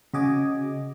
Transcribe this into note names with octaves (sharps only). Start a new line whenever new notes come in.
C#3 F#4 D#5 G#5 D6